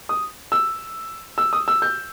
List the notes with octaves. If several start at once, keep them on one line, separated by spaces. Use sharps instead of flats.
D#6
E6
E6
D#6
E6
G6